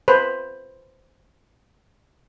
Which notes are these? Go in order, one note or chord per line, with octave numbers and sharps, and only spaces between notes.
B4 C5